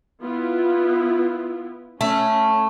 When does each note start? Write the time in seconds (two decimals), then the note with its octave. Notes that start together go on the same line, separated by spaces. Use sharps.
0.22 B3 E4 F4
2.01 A3 C#4